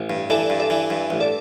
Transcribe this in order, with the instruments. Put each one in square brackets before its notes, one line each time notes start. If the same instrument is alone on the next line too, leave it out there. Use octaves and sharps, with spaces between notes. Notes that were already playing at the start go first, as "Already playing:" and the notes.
Already playing: [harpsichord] A1
G2
[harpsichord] E3 [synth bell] A4 D5
[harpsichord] G2
[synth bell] A4 D5
[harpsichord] E3
G2
A1
[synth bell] A4 D5